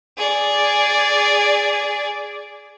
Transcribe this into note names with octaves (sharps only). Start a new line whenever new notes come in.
G#4 D5